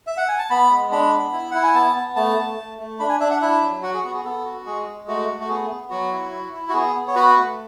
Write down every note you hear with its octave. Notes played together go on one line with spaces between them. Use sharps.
E5
F#5
G#5
A5
B3 B5
G#3
D4 B5
B3
E4
E4 F#5
G#5
B3 A5
B3
A3 A5
A3
A3
A3
D4 B5
G#5
D4 E5
F#5
E4 E5
F#3
F#4 F#5
G#4
B3 F#4
G#4
B3 A4
F#4
G#3 G#4
G#3
A3 F#4
A3
F#4
B3 G#4
B3
F#3 F#4
E4
E4
E4
F#4
B3 G#4
B3
C#5
F#4 B4
A3